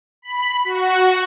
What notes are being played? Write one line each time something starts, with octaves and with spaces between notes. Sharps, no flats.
B5
F#4